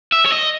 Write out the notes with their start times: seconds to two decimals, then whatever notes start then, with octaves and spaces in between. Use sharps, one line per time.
0.12 E5
0.26 C#5
0.32 D#5